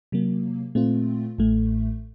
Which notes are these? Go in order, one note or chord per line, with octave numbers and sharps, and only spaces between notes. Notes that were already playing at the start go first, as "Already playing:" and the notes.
C3 F#3 A#3
A#2 A3 C4 F4
A1 A2 A3